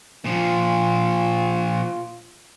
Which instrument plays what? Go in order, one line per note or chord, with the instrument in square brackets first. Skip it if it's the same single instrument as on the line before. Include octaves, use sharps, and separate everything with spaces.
[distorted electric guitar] A#2 F3 [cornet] F4